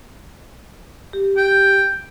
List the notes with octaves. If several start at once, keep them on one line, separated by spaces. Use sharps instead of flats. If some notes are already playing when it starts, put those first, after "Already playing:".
G4
G5